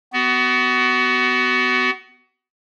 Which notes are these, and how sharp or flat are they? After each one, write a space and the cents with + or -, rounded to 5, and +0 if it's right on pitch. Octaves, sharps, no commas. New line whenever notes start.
B3 +20 F#4 +25